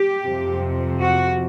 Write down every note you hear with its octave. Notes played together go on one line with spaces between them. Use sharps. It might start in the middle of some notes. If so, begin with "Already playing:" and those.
Already playing: G4
F2 C3 F3
F#4